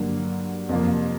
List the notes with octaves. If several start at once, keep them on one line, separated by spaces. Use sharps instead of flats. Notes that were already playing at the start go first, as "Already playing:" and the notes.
Already playing: G2 D3 F#3 A#3
F2 C3 F3 A#3